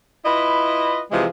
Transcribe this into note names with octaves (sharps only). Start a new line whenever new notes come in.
E4 F4 B4 D#5
C3 E3 F3 G#3